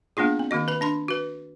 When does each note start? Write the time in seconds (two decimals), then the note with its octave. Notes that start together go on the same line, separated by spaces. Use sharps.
0.17 A#3 B3 D4 F4 G#4
0.39 C4
0.51 D#3 A#3 F#4 D#5
0.68 B4 B5
0.81 D4 B5 C6
1.08 F#4 B4